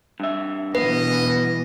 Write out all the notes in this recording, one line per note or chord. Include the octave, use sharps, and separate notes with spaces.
G2 E5
B2 E3 B3 B4 D#5